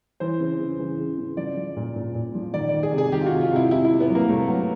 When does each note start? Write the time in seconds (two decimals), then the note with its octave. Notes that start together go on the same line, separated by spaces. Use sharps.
0.20 E3 C5
0.40 C#3
0.60 C#3
0.79 E3
0.99 C#3
1.18 C#3
1.37 F3 D5
1.57 F3
1.76 A#2
1.96 A#2
2.15 A#2
2.35 F3
2.54 D#3 D5
2.69 D#3 D5
2.83 G#4
2.92 C3
2.98 G#4
3.12 D#3 G4
3.21 F4
3.26 F#4
3.32 C3
3.41 F4
3.51 C3 E4
3.71 C3 E4
3.85 E4
3.90 C3
4.00 B3
4.09 F#3
4.15 A#3
4.29 C3 A3
4.48 F#3